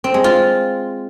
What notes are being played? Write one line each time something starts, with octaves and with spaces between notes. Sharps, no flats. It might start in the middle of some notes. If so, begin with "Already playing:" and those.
C4
G#3
F4